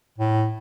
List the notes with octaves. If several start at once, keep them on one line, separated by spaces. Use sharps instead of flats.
A2